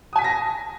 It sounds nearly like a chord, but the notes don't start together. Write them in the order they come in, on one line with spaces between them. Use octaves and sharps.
D#6 G#5 B6 A5 A#6